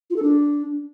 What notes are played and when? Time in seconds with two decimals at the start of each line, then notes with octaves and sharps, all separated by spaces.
0.10 F4
0.16 A4
0.22 D4